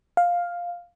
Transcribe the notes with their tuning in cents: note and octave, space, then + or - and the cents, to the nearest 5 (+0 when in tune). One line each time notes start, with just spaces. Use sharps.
F5 +5